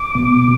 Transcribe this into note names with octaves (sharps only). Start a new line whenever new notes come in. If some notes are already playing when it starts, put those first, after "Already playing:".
Already playing: D6
B2